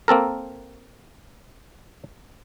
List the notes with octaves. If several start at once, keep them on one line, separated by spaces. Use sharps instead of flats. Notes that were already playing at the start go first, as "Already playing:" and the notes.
A#3 C4 A4 A#4